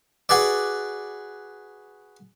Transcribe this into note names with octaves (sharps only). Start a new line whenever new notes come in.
F#4 G#4 B4 D5